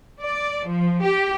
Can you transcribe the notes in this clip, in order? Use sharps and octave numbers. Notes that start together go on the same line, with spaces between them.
D5
F3
G4